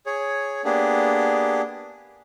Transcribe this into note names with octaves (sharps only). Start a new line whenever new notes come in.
G#4 C#5
A#3 B3 D4 G4 G#4